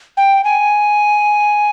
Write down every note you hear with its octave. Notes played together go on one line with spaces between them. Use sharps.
G5
G#5